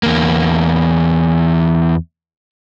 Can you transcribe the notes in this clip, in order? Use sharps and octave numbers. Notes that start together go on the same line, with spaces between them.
E2 A#3